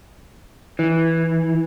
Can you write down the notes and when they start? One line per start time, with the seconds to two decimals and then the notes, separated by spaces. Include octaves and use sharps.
0.79 E3